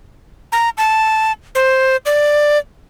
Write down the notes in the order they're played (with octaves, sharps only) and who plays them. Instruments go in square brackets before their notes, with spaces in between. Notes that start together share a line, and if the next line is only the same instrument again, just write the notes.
[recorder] A#5
A5
C5
D5